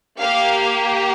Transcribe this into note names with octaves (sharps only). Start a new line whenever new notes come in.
A#3 G4 F5